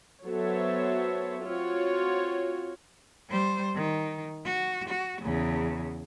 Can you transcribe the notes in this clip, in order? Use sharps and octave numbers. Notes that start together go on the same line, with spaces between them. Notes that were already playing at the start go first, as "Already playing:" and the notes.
F#3 B3 A4 C5 C#5 E5
C4 F4 F#4 C#5
G3 C5
D#3
F#4
F#4
E2 C#3